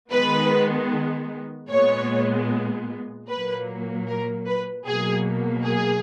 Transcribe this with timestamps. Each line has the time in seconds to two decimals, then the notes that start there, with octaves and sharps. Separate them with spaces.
0.12 D#3 G#3 B3 B4
1.70 A#2 G#3 B3 C#5
3.28 A#2 F#3 A#3 B4
4.08 A#4
4.47 B4
4.86 B2 F#3 A#3 G#4
5.66 G#4